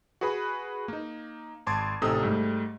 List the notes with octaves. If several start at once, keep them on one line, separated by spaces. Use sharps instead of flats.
F#4 G#4 B4 B5
A#3 D#4
G#1 A5 C6 D6 G#6
A1 C3 D#4 A4 D#6 E6
G#2 G3 A3